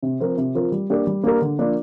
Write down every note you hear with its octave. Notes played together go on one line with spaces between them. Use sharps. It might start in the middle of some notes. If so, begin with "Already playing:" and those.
C3
F3 C4 F4 A#4
C3
F3 C4 F4 A#4
G3
A#3 D4 G4 A#4
G3
A#3 D4 G4 A#4
D3
F3 A#3 D4